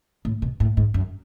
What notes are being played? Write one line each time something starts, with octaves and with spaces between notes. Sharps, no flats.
A2
B2
A2
G#2
F#2